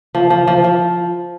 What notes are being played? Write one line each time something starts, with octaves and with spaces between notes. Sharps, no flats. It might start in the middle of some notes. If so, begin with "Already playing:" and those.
F3
F3
F3
F3